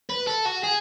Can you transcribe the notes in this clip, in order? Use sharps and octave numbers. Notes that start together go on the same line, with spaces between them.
B4
A4
F#4
G#4